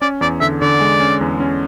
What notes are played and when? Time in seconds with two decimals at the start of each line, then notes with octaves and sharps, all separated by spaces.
0.01 C#4 D5
0.21 E2 D5
0.41 D3 E5
0.61 D3 D5
0.81 G#3
1.00 C#4
1.21 E2
1.40 C#4